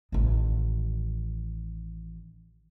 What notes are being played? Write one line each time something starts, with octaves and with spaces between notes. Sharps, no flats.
A1 D#3